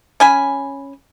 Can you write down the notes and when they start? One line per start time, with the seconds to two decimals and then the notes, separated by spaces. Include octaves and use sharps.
0.20 C#4 G#5 B5